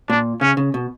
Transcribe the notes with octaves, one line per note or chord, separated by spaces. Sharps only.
A#2 D4
C#3 C#4
C#3
B2